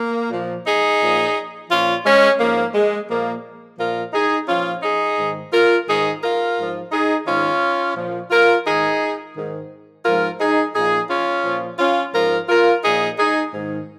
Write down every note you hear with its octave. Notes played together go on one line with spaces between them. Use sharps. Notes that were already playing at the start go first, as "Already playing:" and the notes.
Already playing: A#3
A#2 F3
D#4 G#4
A#2 F3
A#2 F3 C#4 F4
G#3 C#4
G#2 F3 A#3
G#3
A#2 F3 A#3
A#2 F3 F4 A#4
D#4 G#4
A#2 F3 C#4 F4
D#4 G#4
G#2 D#3
F4 A#4
G#2 D#3 D#4 G#4
F4 A#4
G#2 F3
D#4 G#4
G#2 D#3 C#4 F4
A#2 F3
F4 A#4
G#2 D#3 D#4 G#4
G#2 D#3
G#2 F3 F4 A#4
D#4 G#4
A#2 F3 D#4 G#4
C#4 F4
A#2 F3
C#4 F4
G#2 F3 F4 A#4
F4 A#4
A#2 F3 D#4 G#4
D#4 G#4
G#2 D#3